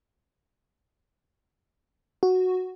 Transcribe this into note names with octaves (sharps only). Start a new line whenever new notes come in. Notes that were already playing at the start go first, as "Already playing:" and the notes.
F#4